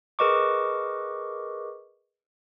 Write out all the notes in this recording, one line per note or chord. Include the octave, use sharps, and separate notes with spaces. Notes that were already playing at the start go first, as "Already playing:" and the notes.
G#4 A#4 B4 D#5 C#6 D6